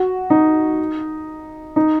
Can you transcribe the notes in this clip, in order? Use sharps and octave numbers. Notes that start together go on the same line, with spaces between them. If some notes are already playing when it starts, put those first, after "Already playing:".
Already playing: F#4
D#4
D#4